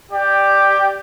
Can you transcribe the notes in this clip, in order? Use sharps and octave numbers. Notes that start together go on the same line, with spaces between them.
G4 D5 G5